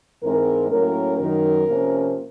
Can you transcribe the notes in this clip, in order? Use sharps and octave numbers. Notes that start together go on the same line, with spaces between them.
G#2 E3 G#3 C4 A#4
A2 F#3 A#3 C#4 A#4
F#2 D#3 F#3 A#4
C3 F3 A#3 C#4